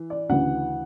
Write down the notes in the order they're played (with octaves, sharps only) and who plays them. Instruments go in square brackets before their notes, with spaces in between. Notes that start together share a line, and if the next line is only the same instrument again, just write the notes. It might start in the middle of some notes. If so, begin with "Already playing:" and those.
Already playing: [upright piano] E3
D5
D2 C#3 E3 F#5